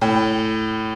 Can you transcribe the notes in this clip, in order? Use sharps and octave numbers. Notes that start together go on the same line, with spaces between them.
A2